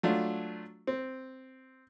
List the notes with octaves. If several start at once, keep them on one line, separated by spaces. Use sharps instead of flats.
F#3 A3 D4 F4
C4